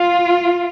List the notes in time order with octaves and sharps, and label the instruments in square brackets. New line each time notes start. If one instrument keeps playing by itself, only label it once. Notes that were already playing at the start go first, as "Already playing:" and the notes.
Already playing: [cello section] F4